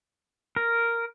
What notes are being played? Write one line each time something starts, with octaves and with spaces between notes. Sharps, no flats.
A#4